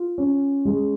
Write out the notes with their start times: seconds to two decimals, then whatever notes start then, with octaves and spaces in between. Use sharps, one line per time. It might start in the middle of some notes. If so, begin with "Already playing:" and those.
Already playing: F4
0.18 C#4
0.65 G#3